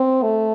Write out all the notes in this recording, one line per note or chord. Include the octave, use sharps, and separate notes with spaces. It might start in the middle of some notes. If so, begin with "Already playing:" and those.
Already playing: C4
A3